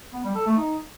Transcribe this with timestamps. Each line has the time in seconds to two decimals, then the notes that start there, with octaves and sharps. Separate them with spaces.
0.13 B3
0.24 G3
0.35 A4
0.46 A3
0.57 D#4